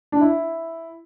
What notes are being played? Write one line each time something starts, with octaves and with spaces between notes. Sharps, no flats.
D4
E4